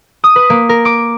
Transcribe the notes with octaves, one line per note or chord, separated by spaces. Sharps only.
D#6
B4
A#3
A#4
D6